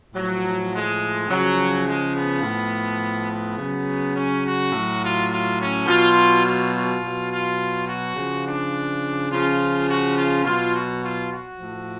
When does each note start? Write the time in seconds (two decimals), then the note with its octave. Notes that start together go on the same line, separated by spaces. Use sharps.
0.14 A2 F3 F#3
0.71 G#3
1.29 C#3 F3 F#3
1.86 G#3
2.14 B3
2.43 A2 F3
3.29 B3
3.58 C#3 F#3
4.15 C#4
4.44 F#4
4.72 A2 F#3
5.01 F4
5.30 F4
5.58 C#4
5.86 B2 F#3 F4
6.44 F4
6.73 F4
7.01 B2 F#3
7.30 F4
7.87 F#4
8.15 C#3 F3
8.45 D4
9.30 C#3 F3 F4
9.88 F#4
10.16 F4
10.44 B2 F#3 F4
10.73 F#4
11.02 F4
11.31 F#4
11.59 A2 F3